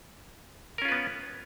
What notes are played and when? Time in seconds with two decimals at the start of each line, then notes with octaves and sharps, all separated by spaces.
0.78 A#4
0.82 C#4
0.85 F4
0.88 B4
0.92 B3